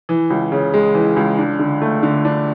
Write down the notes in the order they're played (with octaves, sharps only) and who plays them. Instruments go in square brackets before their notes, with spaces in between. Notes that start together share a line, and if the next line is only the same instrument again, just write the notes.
[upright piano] E3
C#2
C#3
G#3
E3
C#2
D4
D3
A3
D3
D4